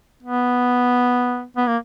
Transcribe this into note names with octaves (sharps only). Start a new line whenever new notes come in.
B3
B3
A#3